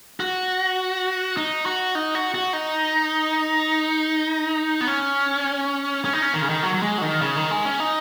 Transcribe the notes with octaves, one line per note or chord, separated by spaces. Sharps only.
F#4
D#4
F#4
D#4
F#4
F#4
D#4
B3
C#4
C#4
D#4
C#4
D#3
C#3
D#3
F#3
F#3
G#3
F#3
D#3
C#3
D#3
G#3
C#4
D#4